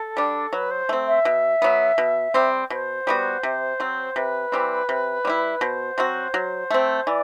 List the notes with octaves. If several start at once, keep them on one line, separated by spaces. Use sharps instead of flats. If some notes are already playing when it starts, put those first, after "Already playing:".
Already playing: A4
G3 D4
F#3 B4
C5
A3 C4
E5
B2
F#3 B3
B2
G3 C4
B2 C5
G3 B3 F#4
C3
F#3 C4
C3 B4
E3 G3 C4
C3
G3 C4 E4
B2 C5
F#3 C4 F#4
F#3
A3 C4
E3 D5